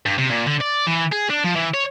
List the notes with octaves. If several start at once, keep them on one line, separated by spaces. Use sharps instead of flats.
G2
C3
A#2
D3
D5
E3
G#4
D4
F3
E3
C#5